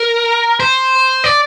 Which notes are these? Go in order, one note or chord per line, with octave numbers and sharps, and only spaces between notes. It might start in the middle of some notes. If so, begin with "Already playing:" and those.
Already playing: A#4
C5
D5